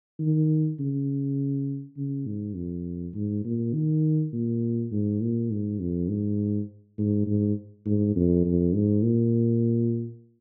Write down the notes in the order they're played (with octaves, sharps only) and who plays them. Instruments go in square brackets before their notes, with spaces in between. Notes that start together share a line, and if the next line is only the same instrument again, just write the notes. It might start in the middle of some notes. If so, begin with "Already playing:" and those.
[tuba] D#3
C#3
C#3
G#2
F2
G#2
A#2
D#3
A#2
G#2
A#2
G#2
F2
G#2
G#2
G#2
G#2
F2
F2
G#2
A#2